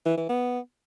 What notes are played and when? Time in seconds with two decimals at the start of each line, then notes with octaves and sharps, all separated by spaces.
0.06 E3
0.17 E3
0.29 B3